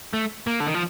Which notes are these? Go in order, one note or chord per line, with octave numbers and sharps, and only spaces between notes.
A3
A#3
D3
D#3
F3